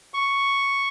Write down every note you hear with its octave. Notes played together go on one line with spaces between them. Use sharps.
C#6